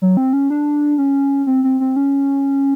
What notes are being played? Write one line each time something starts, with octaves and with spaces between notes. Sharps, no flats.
F#3
C4
C#4
D4
C#4
C4
C4
C4
C#4